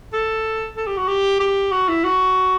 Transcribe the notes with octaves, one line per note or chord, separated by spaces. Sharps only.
A4
A4
G4
F#4
G4
G4
F#4
E4
F#4